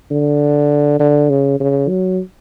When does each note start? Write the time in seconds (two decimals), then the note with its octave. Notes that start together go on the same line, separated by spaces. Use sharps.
0.11 D3
1.00 D3
1.30 C#3
1.60 C#3
1.89 F#3